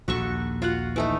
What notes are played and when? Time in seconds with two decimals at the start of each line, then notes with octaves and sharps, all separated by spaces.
0.08 A#1 D#2 F#4 A4 C#6
0.62 F4 F#4 F#5
0.96 E3 A3 D#4